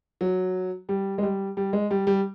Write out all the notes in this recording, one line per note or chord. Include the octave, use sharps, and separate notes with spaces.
F#3
G3
G#3
G3
G3
G#3
G3
G3